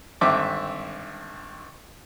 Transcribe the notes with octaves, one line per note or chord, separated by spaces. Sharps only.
G#1 G2 D3 C4 E5 D6